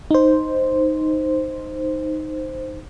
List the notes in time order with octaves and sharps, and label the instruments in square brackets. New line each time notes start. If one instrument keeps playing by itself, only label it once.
[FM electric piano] D#4 C5